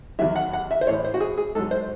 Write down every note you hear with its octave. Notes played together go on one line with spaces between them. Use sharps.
E2 D#3 F#3 E5
F#5
F#5
E5
C5
A2 E3 C#5
C5
F#4
G#4
G#4
G#2 F#3 A4
C5